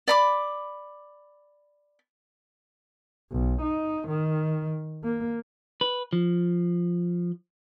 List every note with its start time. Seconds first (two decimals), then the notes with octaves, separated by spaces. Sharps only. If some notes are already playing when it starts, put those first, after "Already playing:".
0.08 D5 B5 D6
3.32 B1
3.62 D#4
4.08 D#3
5.04 A#3
5.81 B4
6.13 F3